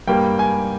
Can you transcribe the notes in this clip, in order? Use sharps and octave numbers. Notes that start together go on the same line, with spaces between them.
G2 G3 A#3 G5
G#5